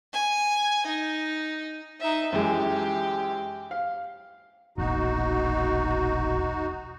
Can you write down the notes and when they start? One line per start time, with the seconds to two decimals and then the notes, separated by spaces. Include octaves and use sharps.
0.13 G#5
0.86 D#4
2.00 D#4 E5
2.32 F#2 E3 G#3 G4
3.71 F5
4.78 E1 A#1 D#4 F#4